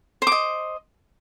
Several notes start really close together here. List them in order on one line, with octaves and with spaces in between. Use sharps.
C5 D6 D#5